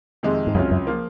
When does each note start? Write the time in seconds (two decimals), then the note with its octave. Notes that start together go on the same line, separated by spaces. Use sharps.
0.23 F2 C3 D#3 G#3
0.47 G#2
0.55 C#2 F#2 C3 F#3 C#4 F4
0.71 F#2
0.87 F3 A#3 F4